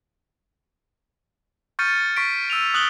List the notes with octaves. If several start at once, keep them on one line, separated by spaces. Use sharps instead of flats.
C#6 F6 G6 A6 C#7 D#7
C#6 B6 D7
E6 D#7 F7
D#6 F#6 F#7 G7